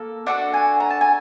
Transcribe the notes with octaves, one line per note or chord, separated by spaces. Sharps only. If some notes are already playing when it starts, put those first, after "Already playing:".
Already playing: A#3 A4
D4 F#4 A4 F#5
G#5
A#5
A5
G#5